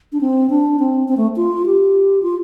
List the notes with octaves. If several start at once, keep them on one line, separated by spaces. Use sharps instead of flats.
D4
C4
D4
C4
C4
A3
F4
G4
F4